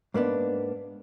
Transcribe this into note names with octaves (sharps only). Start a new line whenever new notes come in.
G#2 A#3 B3 D4